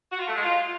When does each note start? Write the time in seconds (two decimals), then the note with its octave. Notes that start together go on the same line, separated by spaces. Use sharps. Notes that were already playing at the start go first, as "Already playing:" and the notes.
0.11 F#4
0.19 F4
0.27 A3
0.35 G#3
0.43 F4